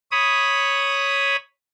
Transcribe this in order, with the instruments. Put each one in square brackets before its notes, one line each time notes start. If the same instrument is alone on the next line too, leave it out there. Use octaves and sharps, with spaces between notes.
[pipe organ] C#5 B5 D#6